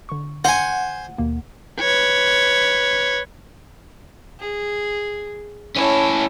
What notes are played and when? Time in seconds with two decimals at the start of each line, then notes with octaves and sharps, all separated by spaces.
0.09 D3 C#6
0.45 C5 F#5 G#5
1.18 D#2 B2 A#3
1.80 B4 C#5
4.40 G#4
5.77 C#4 E4 C#5 A5